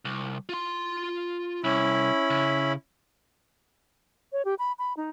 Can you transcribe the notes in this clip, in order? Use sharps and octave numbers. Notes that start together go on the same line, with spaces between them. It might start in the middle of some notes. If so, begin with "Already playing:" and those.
C2
F4 C6
C2 C#4 E4 B5
C#3
C#5
G4
B5
B5
D#4